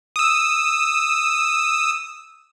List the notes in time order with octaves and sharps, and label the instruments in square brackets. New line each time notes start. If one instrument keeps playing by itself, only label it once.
[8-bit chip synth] D#6 E6